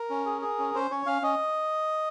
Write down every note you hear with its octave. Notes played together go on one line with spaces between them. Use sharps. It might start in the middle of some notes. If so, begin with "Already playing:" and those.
Already playing: A#4
C#4
G#4
G#4
C#4
C#4 C5
C#4 C#5
C#4 F5
C#4 D#5